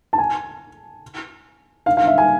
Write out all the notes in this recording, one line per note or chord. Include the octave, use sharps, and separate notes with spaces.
A5
G#5
F5
F5
E5
G#5